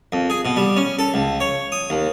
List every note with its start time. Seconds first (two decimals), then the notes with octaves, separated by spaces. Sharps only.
0.12 F2
0.30 G#4
0.45 B2
0.56 G3
0.76 C#4
0.99 A4
1.14 C#2
1.40 C#5
1.72 D#6
1.90 D#2